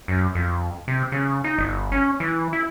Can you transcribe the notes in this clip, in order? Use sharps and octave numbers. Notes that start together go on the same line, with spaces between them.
F#2
F2
C3
C#3
D#4
G1
C#4
E3
E4